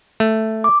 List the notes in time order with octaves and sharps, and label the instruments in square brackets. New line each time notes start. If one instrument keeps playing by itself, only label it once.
[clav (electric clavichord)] A3
[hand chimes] D6